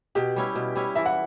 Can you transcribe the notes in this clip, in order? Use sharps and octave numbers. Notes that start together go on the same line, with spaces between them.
B2 G4
G3 C#4 E4
B2
G3 C#4 E4
E3 E5
F#5